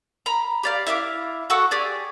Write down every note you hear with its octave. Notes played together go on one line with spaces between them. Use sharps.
A#5 B5
G4 D5 F5
E4 E5 F5 D6
F#4 A4 F#5 E6
G4 G#4 D5